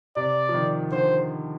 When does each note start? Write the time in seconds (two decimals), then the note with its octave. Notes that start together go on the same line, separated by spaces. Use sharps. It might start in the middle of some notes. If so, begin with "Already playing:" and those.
0.16 C3 D5
0.49 F3
0.54 D#3
0.92 D3 C5